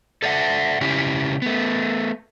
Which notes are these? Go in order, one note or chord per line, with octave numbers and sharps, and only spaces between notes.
A4 D5 E5 F#5
C#3 C#4 E4 G4
A3 B3